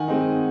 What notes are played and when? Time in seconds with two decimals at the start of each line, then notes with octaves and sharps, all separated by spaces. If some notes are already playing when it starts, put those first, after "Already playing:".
Already playing: D#3 F#5 G#5
0.08 G#3 C4 D#4